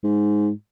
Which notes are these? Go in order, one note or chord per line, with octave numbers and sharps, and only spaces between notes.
G#2